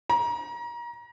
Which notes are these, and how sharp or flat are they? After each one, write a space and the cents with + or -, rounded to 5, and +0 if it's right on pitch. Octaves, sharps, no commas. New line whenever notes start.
A#5 +30